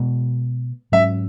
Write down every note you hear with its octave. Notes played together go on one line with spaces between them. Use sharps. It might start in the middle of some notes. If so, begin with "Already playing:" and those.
Already playing: B2 G#3 B3
G#2 F#3 C#4 E5